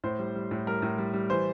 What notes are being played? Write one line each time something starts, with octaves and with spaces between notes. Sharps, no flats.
A2 C5
G3
G3
A2
G3 A#4
A2
G3
G3
E3 C5